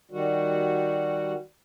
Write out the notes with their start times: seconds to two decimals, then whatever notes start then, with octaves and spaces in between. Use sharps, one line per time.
0.11 D#3 G3 F#4